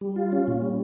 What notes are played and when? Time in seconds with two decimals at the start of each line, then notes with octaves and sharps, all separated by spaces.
0.01 G3
0.16 F4
0.32 C#4
0.47 A#2
0.62 G3